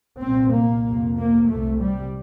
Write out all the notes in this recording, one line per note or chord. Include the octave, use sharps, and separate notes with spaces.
C2 A#2 C4
A#3
F2 C3
A#3
C2 C3 A3
G3